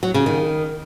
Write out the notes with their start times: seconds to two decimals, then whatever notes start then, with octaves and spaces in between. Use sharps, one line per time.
0.03 F#3
0.14 C#3
0.26 D#3